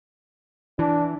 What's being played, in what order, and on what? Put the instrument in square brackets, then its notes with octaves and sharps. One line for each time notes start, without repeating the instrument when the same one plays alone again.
[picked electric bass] E3 [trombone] D4